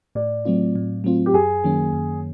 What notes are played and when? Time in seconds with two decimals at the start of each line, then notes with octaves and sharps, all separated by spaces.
0.15 A2 D5
0.45 F#3 A3 C4 F4
0.76 A2
1.04 F#3 A3 C4 F4
1.26 G4
1.34 F#2 G#4
1.64 D#3 F#3 A#3 C#4
1.93 F#2